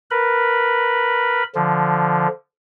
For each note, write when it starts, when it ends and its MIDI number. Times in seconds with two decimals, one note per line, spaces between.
0.11 1.43 70
0.11 1.43 71
0.11 1.43 83
1.55 2.28 50
1.55 2.28 53